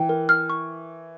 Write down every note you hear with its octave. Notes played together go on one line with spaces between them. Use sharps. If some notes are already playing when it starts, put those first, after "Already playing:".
Already playing: E3 G5
A#4
F6
C#6